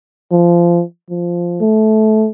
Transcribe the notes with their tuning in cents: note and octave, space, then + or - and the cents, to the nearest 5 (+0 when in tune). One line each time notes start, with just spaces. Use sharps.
F3 -20
F3 -5
A3 -20